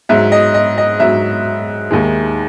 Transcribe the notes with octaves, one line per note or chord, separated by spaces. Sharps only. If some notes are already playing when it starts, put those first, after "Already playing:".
G#2 F#3 E5
D#5
D#5
D#5
G#2 F#3 E5
D#2 D#3 G#3